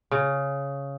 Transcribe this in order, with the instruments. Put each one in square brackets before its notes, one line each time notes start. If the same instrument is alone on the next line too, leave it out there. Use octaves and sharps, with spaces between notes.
[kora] C#3